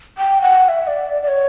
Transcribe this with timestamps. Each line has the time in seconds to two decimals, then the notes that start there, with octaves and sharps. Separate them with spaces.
0.18 G5
0.42 F#5
0.64 F#5
0.69 E5
0.87 D5
1.23 D5
1.28 C#5